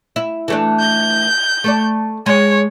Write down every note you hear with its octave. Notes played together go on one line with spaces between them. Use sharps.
E4
E3 A3 D4
G6
A3 A4 D5
G#3 C#5